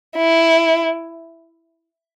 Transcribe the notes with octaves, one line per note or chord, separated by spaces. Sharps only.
E4